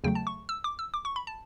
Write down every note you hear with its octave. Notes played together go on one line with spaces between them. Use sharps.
E2 C#3 F#3 A3 G5
A5
C#6
E6
D6
E6
D6
C#6
B5
A5